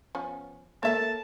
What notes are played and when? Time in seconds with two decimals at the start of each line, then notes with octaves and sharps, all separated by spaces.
0.15 F3 B3 C#4
0.83 A#3 A4 C#5 E5 A5